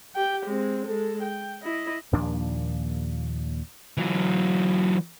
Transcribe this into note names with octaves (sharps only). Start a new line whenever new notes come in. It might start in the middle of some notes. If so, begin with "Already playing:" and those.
G4 G5
G#3 C4
G#3 A4
G5
E4 D#5
D#2 A#2 F3 D4
E3 F#3